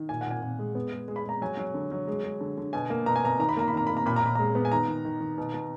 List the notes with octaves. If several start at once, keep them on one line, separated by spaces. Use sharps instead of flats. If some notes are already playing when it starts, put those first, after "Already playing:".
Already playing: D#3
A#2 G#5
A#2 F#5
G#5
A#2
G#3
B3
G#3
G#3
B5
G#3 A#5
F#3 G#5
F#3
D3
F#3
G#3
G#3
D3
D3
B2 G#5
A#3
B2 A#5
G#5
B2 A#5
D#3 A#5
B5
A#3 A#5
B5
D#3 A#5
A#3 B5
A#5
A#2 B5
A#5
A#2 B5
G#3 A#5
B3
G#5
D#3 A#5
D#3
D#3
D#3
B2
B2